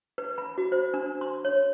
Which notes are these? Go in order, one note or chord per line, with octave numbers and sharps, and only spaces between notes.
B4
B5
F#4
C5
D4
C6
C#5